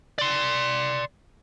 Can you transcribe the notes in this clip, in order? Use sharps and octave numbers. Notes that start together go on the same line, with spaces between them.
D5 C6